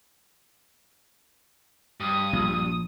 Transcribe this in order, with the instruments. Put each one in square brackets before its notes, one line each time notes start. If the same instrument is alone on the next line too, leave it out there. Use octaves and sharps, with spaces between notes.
[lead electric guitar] G2 [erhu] D#6
[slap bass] A#1